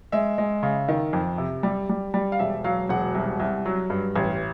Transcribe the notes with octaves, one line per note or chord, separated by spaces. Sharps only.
G#3 E5
G#3
C#3
D#3
F2
C3
G3
G3
G3
F5
E1 E5
F#3 F5
E1 F#5
C2
C2
F#3
G2
A1